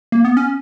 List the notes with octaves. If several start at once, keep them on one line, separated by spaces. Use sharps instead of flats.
A#3
B3
C#4